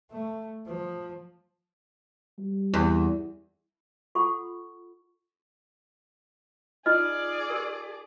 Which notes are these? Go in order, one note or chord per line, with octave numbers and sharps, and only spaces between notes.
A3
F3
G3
E2
F4 A4 F#5 B5 C#6
D#4 F4 G#4 D5 D#5 F6
G4 A#4